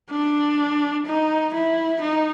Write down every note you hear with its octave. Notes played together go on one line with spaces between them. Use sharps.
D4
D#4
E4
D#4